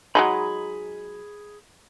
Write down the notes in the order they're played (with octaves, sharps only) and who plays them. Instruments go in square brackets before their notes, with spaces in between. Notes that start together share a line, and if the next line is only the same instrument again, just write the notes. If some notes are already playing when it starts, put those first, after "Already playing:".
[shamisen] F#3 G#3 D#4 [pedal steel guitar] G#4 B5